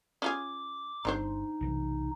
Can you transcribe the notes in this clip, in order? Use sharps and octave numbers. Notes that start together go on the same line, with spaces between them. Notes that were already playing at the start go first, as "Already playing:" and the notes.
C#4 F4 G#4 D6
G1 C4 D4 D#4 C5
B1 C3 E3